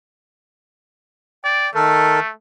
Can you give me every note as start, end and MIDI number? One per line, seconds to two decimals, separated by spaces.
1.44 1.68 74
1.44 1.70 79
1.75 2.20 51
1.75 2.32 57
1.75 2.20 69
1.75 2.20 70